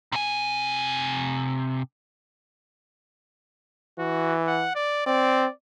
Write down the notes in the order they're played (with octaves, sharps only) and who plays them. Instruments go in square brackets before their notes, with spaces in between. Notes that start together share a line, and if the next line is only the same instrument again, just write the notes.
[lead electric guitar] C3 G#5
[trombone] E3 [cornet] F#4
[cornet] F#5
D5
[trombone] C4 [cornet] D5